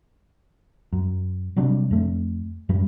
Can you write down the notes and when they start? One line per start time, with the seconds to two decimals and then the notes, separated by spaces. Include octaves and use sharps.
0.93 F#2
1.56 C3 F#3 G3 D4
1.91 F2 A3
2.69 F#2 G3